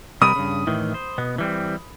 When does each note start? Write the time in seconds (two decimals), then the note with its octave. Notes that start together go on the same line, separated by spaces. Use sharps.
0.21 C3 G3 A#4 B5 D#6 D#7
0.36 G2 C#3
0.67 A2 D#3 E3
0.94 C5
1.18 B2 B3
1.38 E3 G3 C4